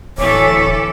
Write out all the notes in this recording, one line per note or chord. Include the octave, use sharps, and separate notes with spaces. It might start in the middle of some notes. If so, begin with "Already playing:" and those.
D1 E3 A4 C#5 D6